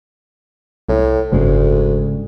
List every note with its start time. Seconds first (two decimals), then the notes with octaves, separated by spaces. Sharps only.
0.89 C2 A2
1.32 F#1 D2 G#2 C#3 G#3